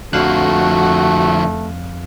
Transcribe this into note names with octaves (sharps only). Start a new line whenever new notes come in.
F2 D3 F3 A3 F#4 F5 F#6